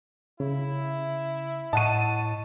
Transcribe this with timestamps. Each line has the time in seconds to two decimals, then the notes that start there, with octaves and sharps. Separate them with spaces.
0.40 C#3 E4
1.73 A2 D#5 F#5 A5 C#6 D#7